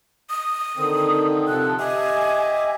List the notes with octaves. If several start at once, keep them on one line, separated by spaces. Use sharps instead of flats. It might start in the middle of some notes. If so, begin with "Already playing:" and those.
D#6
D3 D#3 C4
C3 F3 A4 F#6
G4 D#5 E5 G#5